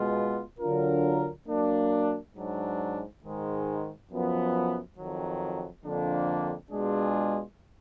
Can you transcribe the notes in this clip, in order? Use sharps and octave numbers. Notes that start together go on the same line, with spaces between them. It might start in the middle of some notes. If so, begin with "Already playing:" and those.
Already playing: B2 G#3 B3 F4
D3 F#3 D4 F4 A#4
F#3 A#3 D4
G#2 F#3 D4
G#2 D#3 G#3
F#2 F3 B3
F2 D#3 F#3
F2 D3 F3 A#3 D4
B2 G#3 D4 F4 G#4